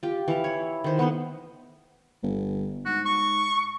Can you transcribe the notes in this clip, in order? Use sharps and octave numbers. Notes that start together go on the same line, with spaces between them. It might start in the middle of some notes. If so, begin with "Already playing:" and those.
F4 G4
E3 F5
E4 C#5
D#3 C5
A3 B3 D#4 C5
G1
G#2 F#4
C#6